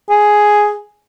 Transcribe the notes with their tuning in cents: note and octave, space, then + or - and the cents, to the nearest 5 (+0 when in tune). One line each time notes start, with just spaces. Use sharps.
G#4 +5